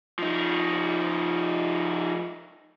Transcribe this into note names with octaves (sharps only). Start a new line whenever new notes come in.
F3 D#4